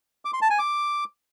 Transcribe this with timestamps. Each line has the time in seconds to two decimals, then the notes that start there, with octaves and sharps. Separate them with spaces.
0.25 D6
0.33 C6
0.42 A5
0.50 G#5
0.59 D6